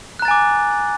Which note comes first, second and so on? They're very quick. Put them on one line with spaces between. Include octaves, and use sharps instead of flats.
F#6 A#5 A6 G#5 D6